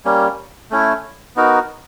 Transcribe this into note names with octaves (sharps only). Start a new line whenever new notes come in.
G3 A#3 C#4
A3 C#4 E4
B3 D#4 F#4 A#4